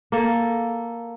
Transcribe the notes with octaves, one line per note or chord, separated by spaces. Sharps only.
A#3 A4